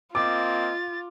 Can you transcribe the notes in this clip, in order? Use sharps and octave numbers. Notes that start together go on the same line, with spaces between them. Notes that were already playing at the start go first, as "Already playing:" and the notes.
A#3 C4 F4 D#5 D6 A6